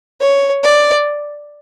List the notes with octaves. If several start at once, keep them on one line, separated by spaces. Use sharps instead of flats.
C#5
D5